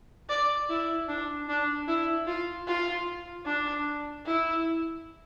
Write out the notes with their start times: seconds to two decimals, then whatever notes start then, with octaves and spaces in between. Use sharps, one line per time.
0.29 D5
0.69 E4
1.08 D4
1.49 D4
1.88 E4
2.27 F4
2.67 F4
3.46 D4
4.26 E4